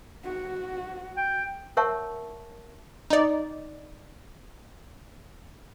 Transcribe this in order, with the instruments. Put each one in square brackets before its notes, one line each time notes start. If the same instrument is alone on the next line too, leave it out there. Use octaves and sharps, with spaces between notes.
[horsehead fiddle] F#4
[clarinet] G5
[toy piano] A#4 C#5 E5 F#5 A5 C#6
[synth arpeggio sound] D#4 D5